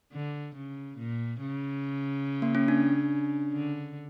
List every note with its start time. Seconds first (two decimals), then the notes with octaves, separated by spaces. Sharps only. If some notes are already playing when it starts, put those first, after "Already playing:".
0.13 D3
0.56 C#3
0.99 A#2
1.41 C#3
2.42 A#3
2.55 C#4
2.68 D4
3.53 D3